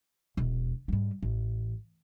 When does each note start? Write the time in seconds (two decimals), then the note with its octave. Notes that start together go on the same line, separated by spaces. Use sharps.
0.37 E1
0.88 G#2 G3
1.22 A1